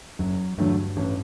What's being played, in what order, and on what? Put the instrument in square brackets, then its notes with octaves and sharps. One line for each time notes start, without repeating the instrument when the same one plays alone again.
[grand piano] F#1 [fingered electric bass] F#3
[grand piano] E2 D3 F#3 A3 [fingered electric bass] G2
[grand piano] A1